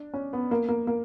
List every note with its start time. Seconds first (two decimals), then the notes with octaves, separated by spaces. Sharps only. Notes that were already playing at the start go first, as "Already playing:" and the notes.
Already playing: D4
0.14 C#4
0.33 B3
0.51 A#3
0.69 A#3
0.87 A#3